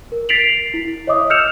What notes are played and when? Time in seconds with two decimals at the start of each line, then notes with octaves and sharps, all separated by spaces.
0.12 A#4
0.29 A6 B6 C7 D7 F7 F#7
0.74 E4
1.07 C#5 D#5 E5 D6 D#6
1.30 E6 F6 G6 C#7 E7 F7